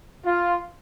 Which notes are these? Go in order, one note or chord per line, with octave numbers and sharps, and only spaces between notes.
F4